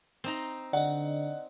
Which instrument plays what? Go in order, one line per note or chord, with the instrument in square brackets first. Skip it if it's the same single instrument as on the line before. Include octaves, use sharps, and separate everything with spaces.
[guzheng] C4 D#4 A#5
[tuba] D3 [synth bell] D5 D#5 [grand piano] F#5